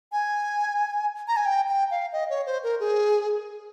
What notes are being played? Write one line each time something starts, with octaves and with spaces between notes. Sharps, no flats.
G#5
A#5
G#5
G5
G5
F5
D#5
C#5
C5
A#4
G#4